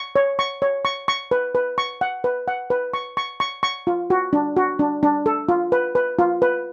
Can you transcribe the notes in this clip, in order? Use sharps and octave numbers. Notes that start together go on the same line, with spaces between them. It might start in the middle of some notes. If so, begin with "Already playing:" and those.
Already playing: C#6
C#5
C#6
C#5
C#6
C#6
B4
B4
C#6
F#5
B4
F#5
B4
C#6
C#6
C#6
C#6
F4
F#4
D4
F#4
D4
D4
A4
F4
B4
B4
F4
B4